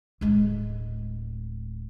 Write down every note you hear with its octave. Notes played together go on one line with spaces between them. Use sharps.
D1 G#3